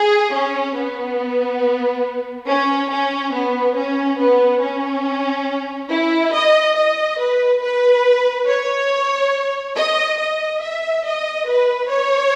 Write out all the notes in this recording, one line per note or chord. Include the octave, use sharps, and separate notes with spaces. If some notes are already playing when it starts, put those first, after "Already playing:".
Already playing: G#4
C#4
B3
C#4
C#4
B3
C#4
B3
C#4
E4
D#5
D#5
B4
B4
C#5
D#5
D#5
E5
D#5
B4
C#5